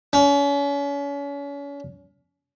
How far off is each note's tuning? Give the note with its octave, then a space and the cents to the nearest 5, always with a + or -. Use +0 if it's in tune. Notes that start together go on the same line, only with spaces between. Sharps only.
C#4 +35